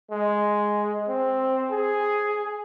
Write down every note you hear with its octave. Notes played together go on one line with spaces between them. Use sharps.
G#3
C4
G#4